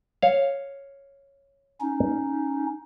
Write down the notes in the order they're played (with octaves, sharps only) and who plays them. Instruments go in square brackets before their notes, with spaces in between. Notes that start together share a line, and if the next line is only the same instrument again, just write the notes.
[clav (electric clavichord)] C#5 F5
[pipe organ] C#4 D#4